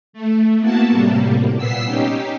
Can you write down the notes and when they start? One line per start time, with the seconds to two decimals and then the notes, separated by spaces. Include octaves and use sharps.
0.13 A3
0.59 A#3 B3 E4 F#4 A5
0.90 A2 C3 G3 A#3
1.55 A#2 B3 E6 B6 C7
1.85 C#4 D#4 G4